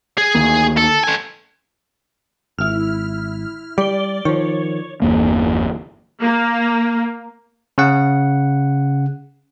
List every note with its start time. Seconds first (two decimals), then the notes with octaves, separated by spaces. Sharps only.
0.18 G#4
0.35 D2 D#3 A#3
0.77 A4
1.04 A3 G#5
2.59 G#1 E4 F6
3.78 G3 D5 G7
4.25 D#3 F3 C#5
5.02 G1 E2 A#3
6.22 A#3
7.78 C#3 F#5